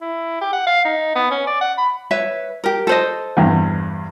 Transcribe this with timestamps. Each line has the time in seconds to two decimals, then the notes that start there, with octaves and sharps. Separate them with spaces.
0.01 E4
0.41 G4
0.53 F#5
0.67 F5
0.85 D#4
1.15 B3
1.31 C#4
1.47 D5
1.61 F#5
1.78 B5
2.11 B4 C#5 E5
2.64 G4 A#4
2.87 A4 C5 D#5
3.37 E2 G2